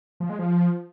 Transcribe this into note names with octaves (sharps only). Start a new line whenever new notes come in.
F3
G#3
F3